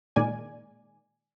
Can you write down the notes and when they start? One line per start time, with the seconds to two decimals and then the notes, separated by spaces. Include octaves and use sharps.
0.16 A#2 D#3 G#3 A#3 D5 G#5